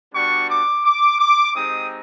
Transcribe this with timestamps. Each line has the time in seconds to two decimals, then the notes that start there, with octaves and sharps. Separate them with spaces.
0.14 G3 B3 D4 F#4 C#6
0.49 D6
0.84 D6
1.19 D6
1.55 G#3 C4 D#4 G4 D#6